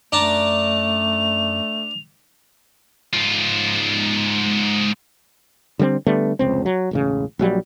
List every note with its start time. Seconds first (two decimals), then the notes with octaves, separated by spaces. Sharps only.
0.12 F#2 A3 D4 A5 A#5 F7
3.13 G#2 F4
5.79 D3 G3 A3 C4
6.07 D3 G3 A3 B3
6.39 F1 C#2 C4
6.66 F#3
6.91 E1 A1 C#3
7.39 A#1 F#3 G3